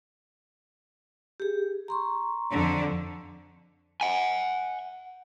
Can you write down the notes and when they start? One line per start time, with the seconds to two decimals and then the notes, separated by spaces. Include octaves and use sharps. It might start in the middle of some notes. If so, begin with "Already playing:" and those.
1.40 G4 G#4
1.88 A#5 C6 C#6
2.52 F2 D3
4.01 F#5 G#5